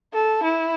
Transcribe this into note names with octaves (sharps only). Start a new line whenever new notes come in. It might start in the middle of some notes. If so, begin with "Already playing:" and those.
A4
E4